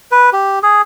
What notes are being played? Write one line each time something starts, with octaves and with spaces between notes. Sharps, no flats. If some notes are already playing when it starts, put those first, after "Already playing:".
B4
G4
G#4